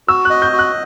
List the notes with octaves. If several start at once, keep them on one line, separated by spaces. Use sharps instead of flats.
F#4 E6
F#6
D#5
G6
F#4
F#6